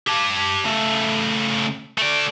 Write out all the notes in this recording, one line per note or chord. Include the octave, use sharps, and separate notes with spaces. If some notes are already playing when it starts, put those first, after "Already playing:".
G4 A5
C#3 A3
A3 D5